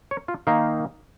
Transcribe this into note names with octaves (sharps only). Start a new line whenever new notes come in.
C#5
F4
D#3 A#3 D#4 F5